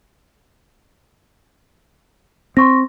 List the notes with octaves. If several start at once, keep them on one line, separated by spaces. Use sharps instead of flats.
C4 C6 C#6 A#6